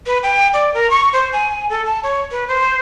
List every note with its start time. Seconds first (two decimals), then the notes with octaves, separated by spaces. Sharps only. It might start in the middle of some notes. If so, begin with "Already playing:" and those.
0.06 B4
0.23 G5
0.53 D5
0.74 A#4
0.90 C#6
1.13 C5
1.33 G#5
1.69 A4
1.85 A5
2.03 C#5
2.31 B4
2.48 C5